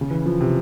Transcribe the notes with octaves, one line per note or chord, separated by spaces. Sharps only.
C#3
E3
F3
C3